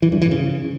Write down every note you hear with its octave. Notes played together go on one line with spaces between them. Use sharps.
E3
G2
E3
C#3